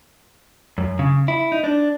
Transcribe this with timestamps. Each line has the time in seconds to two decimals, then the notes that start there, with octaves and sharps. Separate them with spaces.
0.78 F#2
0.99 C#3
1.28 E4
1.52 D#4
1.64 D4